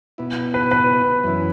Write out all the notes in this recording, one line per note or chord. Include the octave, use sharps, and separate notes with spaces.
B2 B3 E4
B4
B4
F#2 E3 C#4 E4